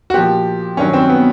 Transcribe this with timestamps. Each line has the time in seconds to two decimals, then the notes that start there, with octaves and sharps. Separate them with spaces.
0.10 F#4
0.14 A#2 F3 G4
0.77 G2 D#3 F#3 C#4
0.93 C4
1.09 B3